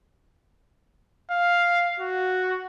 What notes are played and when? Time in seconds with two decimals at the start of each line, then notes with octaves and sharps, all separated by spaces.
1.31 F5
2.00 F#4